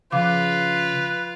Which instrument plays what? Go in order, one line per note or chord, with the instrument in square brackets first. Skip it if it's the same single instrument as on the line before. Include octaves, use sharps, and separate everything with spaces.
[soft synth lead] C#3 [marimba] F3 F5 D6 [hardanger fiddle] F4 [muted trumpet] B4